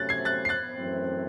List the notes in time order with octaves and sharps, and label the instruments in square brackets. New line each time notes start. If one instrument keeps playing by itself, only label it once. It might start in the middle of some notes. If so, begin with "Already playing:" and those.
Already playing: [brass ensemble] C3 F#3 A3 C#4 [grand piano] F#6 A6
[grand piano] G#6 C7
F#6 A6
C7
F#6 A6
[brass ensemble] F#2 E3 A3 C4